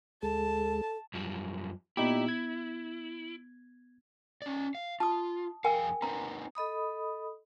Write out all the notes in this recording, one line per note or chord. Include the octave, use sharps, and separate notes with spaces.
D2 G#3 G#4 A4 A5
F#2 F3 G3
A#2 B3 D#4 E4 G4
G#6
C#4 D5
F5
F4 A5 D#6
F2 G#4 A#4 F5 G5 G#5
C4 D#4 B4 A#5
A4 D#5 B5 D#6